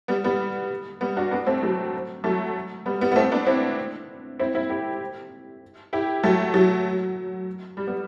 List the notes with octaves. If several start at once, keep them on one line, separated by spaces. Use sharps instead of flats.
G3 B3
G3 B3
G3 B3
D4 F#4
B3 D4
A3 C4
F#3 A3
F#3 A3
G3 B3
G3 B3
B3
A3 C4
B3 D4
C4 E4
C4 E4
C4 E4
E4 G4
E4 G4
F#3 A3
F#3
G3
G3 B3